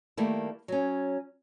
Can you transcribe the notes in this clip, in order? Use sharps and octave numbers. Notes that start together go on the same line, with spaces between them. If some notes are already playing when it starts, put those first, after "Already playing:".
D#3 G3 A3 A#3 E4
F#3 C#4